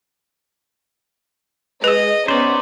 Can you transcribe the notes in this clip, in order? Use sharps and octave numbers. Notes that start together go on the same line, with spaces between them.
G#3 G#4 B4 D#5
B3 C#4 D#4 C5 D5